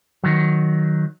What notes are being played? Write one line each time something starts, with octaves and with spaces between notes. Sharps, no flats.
D#3 F#3